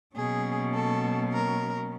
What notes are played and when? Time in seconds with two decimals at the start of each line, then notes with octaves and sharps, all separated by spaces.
0.15 B2 F#3 A#3 C#4 G#4
0.74 A4
1.33 A#4